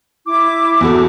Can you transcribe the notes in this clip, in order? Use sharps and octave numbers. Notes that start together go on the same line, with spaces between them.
E4 D6
E2 F#4 A4